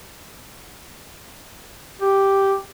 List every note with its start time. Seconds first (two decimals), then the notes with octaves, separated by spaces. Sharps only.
2.01 G4